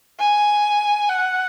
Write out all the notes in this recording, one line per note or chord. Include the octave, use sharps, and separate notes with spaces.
G#5
F#5